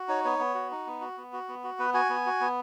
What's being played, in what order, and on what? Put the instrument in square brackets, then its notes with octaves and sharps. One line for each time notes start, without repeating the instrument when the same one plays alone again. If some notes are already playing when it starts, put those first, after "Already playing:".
Already playing: [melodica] F#4
D#4 C#5
B3 C#5
B3
F#4
D#4
B3
F#4
B3
F#4
B3
F#4
B3 B4
F#4 G#5
B3
F#4
B3